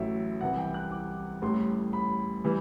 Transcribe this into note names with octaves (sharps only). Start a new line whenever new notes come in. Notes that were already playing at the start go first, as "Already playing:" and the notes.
Already playing: A1 A2 F#3 E5
C2 C3 E3 G3 F#5
G5
F#6
D6
A1 A2 G3 C6
B5
E3 G3